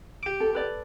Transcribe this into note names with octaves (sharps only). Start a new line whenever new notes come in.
G4 D6
A4
A4 B4 D5